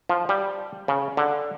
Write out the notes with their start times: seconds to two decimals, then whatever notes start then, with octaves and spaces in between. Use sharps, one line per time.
0.09 F3
0.29 G3
0.88 C#3
1.17 D3